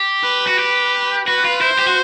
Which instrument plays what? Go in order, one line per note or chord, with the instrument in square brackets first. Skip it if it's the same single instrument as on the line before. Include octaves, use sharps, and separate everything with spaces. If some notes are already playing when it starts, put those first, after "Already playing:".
Already playing: [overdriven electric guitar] G4
[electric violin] B4
[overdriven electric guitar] F#4
G4
[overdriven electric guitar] F#4 [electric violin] B4
[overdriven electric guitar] F4
[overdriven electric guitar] E4 [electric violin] C5
[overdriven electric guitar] G4
F#4